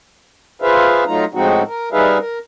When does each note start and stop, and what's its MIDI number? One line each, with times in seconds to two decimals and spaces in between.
0.62 1.04 65
0.62 1.04 68
0.62 1.04 71
0.62 1.04 72
0.62 1.04 76
0.62 1.04 77
1.07 1.25 54
1.07 1.25 57
1.07 1.25 63
1.07 1.25 65
1.07 1.25 82
1.34 1.63 45
1.34 1.63 53
1.34 1.63 56
1.34 1.63 60
1.34 1.63 63
1.34 1.63 66
1.68 1.89 70
1.92 2.18 55
1.92 2.18 63
1.92 2.18 68
1.92 2.18 71
1.92 2.18 76
1.92 2.18 77
2.20 2.39 70